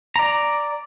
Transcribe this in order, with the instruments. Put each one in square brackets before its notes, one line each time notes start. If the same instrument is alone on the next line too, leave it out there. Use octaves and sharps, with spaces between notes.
[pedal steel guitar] D5 A#5